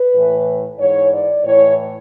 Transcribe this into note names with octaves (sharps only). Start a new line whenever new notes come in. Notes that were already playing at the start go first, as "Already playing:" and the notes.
Already playing: B4
A2 E3
G#2 E3 C#5
D5
A2 E3 C#5